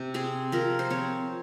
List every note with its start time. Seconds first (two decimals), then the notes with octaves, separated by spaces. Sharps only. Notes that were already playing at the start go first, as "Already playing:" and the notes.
Already playing: C3
0.14 C4 G#4
0.52 F3 A#4
0.79 C5
0.90 C4 C#5